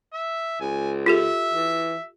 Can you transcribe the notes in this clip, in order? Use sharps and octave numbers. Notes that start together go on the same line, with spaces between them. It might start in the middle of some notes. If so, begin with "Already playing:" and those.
E5
C#2 G#5
F4 G4 A4 E5
E3